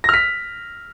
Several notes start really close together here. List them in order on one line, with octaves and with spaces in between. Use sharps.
A#6 F6 B6